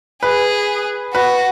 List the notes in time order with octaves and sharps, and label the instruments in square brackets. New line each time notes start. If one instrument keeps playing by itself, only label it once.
[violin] G#4 [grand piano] B4
[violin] F#4 [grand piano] B4